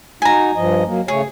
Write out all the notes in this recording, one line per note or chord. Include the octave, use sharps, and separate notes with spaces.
D#4 F#4 G#5 A#5
G2 F3 D#5
F#3 A#3
C#3 A3 G#4 C#5